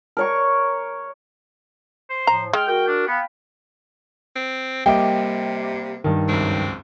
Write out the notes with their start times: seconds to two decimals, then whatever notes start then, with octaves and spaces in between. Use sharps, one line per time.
0.17 A#4 C#5 C#6
2.10 C5
2.27 A2 F3 A#5
2.53 G#3 G5 F6
2.68 F#4 A#4 G5
2.88 D4
3.07 B3 F5 G5 B5
4.36 C4
4.86 C3 G3 A#3 D#5 E5 G5 D6
6.04 G2 D#3
6.29 C#2 F#2 C4